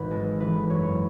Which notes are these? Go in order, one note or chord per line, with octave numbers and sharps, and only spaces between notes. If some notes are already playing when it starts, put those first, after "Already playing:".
Already playing: G#1 E3 B4
G#3 A4
E3 B4
F#2 C#5